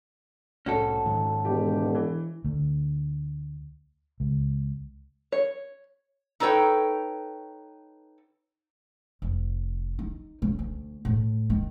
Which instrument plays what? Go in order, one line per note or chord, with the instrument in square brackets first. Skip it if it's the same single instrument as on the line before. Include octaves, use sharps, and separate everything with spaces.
[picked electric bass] C2 A2 [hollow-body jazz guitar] C#4 F#4 A4
[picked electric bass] G#2 D#3 F#3
[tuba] E1 [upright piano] G4
[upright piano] E3
[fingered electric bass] D2
C#2
[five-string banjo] C#5
[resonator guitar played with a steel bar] D#4 A4 B4 C#5 G5
[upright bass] F1
D#4
C#3
D2
A2
D#3